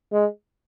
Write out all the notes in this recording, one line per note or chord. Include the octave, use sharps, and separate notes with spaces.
G#3